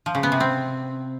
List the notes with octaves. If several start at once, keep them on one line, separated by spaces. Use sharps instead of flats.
F3
C#3
B3
C3
C4